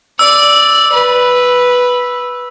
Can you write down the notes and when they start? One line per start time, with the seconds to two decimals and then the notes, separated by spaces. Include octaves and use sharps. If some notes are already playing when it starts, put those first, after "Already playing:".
0.19 D5 E6
0.92 B4